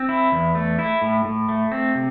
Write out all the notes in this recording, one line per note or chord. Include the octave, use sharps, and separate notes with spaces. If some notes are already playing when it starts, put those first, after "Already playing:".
Already playing: C4
E4
E2
A3
E4
A2
A2
A3
C4
C3